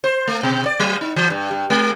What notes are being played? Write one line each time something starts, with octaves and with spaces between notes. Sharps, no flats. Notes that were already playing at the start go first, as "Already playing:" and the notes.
C5
A3
B2
D5
F#3
D#4
E3
G2
G2
G#3